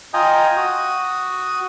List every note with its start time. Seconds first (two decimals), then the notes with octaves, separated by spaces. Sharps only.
0.14 F4 D#5 G5 G#5 A#5 D#6
0.57 F#4 D#6